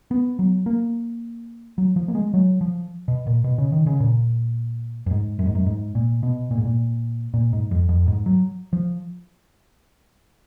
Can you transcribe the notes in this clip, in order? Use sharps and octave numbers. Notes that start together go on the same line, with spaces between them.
B3
F#3
A#3
F#3
F3
A#3
G#3
F#3
F3
B2
A#2
B2
C#3
D#3
C#3
A#2
F#2
G#2
F#2
G#2
F#2
G#2
A#2
B2
A#2
G#2
A#2
A#2
G#2
F2
F2
G#2
F#3
F3